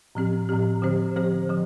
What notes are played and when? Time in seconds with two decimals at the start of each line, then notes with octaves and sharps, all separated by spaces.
0.15 A2 F3 C4 G4
0.49 A2 F3 C4 G4
0.82 D3 F3 C4 G4 C5
1.16 D3 F3 C4 G4 C5
1.50 D3 F3